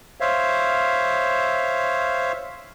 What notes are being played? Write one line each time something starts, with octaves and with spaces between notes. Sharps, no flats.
C5 C#5 E5 F5